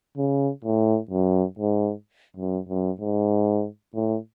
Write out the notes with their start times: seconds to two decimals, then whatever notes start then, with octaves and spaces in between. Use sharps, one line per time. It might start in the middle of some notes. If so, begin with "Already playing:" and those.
0.17 C#3
0.64 A2
1.11 F#2
1.59 G#2
2.36 F#2
2.69 F#2
3.00 G#2
3.95 A2